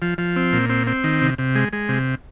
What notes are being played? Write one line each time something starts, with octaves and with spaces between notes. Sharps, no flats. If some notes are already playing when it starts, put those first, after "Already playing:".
F3
F3
C4
A#2
C4
C4
D#3
C3
C3
G#3
G#3
C3